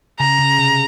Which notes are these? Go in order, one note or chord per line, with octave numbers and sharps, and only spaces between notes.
C#3 A#5
C#3
C3